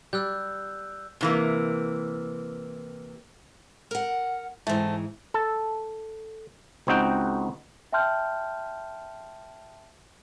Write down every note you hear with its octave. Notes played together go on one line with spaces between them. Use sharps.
G3 E6 F#6 G6
C3 E3 A#3
A#4 F#5
G#2 E3 A3 C4
A4
C#2 C4 D#4 F#4 G5
E5 G5 A5 C6 F6 G6